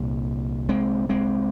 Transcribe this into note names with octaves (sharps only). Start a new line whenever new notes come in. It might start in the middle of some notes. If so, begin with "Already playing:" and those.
Already playing: C2 A#2
G#3 C4
G#3 C4